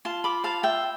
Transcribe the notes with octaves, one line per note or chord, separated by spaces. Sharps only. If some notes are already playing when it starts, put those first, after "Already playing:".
F4 A5 C6
B5 D6
C5 F5 A5
E5 G5